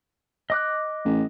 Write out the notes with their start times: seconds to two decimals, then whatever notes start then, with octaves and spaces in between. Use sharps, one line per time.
0.50 D#5 D6 F#6
1.05 A1